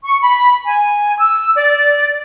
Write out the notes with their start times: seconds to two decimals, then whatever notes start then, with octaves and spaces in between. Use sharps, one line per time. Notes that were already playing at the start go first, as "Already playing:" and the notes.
0.04 C#6
0.22 B5
0.64 G#5
1.19 E6
1.55 D5